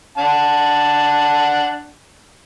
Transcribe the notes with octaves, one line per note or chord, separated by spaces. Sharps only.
D4 F#5 A5